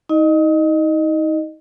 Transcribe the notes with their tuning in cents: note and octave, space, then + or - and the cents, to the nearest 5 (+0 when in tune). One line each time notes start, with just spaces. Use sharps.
D#4 +35 D#5 -20